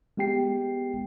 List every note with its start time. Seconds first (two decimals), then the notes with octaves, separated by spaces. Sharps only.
0.17 G#3 B3 G4 G5 C7